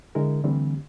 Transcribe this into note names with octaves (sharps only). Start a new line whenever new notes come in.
D3 G#3 E4 A#4
D3 E3 G3 A3 C4